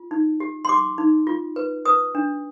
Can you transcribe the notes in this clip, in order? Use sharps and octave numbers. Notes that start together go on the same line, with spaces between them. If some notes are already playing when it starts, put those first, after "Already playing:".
Already playing: F4
D#4
G4
C6
G4 D6
D#4
F4
B4
B4 D#6
D4